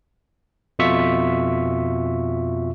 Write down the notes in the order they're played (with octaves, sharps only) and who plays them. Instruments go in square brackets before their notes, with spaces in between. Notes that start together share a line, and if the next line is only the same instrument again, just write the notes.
[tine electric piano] F2 B2 F4 E5 C#6 B6